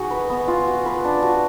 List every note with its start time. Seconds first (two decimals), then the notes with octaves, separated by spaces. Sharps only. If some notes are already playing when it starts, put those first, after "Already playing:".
Already playing: D#4 F#4 G#4
0.11 B4
0.30 B3
0.48 F4
0.67 F#4
0.86 B4
1.05 D4
1.23 F#4